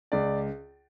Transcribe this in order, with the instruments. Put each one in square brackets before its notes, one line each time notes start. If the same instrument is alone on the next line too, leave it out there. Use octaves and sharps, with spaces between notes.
[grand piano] C#2 D5